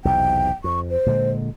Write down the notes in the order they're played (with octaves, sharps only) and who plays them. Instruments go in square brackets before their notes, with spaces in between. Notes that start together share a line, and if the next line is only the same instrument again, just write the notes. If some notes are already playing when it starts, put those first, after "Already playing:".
[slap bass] B1 E2 C3 [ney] G5
[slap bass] F2 [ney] C#6
[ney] C5
[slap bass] A#2 D3 G#3